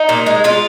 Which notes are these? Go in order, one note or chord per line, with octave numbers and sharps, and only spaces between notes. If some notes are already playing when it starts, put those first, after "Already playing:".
Already playing: D#4
A#2
G#3
G#3 F4